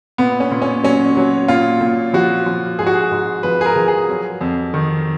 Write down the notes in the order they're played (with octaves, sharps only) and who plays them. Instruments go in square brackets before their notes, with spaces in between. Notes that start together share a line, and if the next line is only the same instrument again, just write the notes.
[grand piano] A#2 B3
C#4
A#2
C#4
F#3 C#4
F#3
A#2 F4
A#2
F3 F#4
F3
G#2 G#4
F#4
G#4
G#2
F3 B4
G#4
A#4
F3
G#4
F#3
F2
D#3